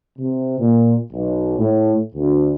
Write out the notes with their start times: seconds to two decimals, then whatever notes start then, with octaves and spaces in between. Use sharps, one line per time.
0.19 C3
0.58 A#2
1.12 B1
1.58 A2
2.14 D2